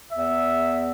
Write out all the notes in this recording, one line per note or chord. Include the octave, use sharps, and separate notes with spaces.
E2 E5